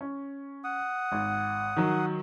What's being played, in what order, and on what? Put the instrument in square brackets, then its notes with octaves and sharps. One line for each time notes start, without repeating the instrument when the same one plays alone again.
[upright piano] C#4
[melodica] F#5 D#6
[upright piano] G#1
D#3 F#3